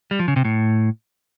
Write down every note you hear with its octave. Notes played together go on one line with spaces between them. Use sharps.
G3
F3
C#3
C3
A2